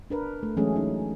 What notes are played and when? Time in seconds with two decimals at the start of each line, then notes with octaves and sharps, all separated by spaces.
0.10 D4 A#4 B4
0.43 A3
0.57 E3 F#3 G#3 A3 C#4 G#4
0.76 C#4 D#4